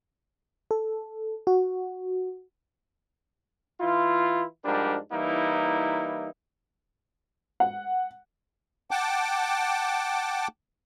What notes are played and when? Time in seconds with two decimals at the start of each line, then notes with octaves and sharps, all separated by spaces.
0.71 A4
1.47 F#4
3.81 E3 E4 F4
4.64 G#2 F3 G3 D4 A#4
5.11 E3 G3 A#3 D#4 E4
7.60 F#5
8.91 F#5 G5 A5 D6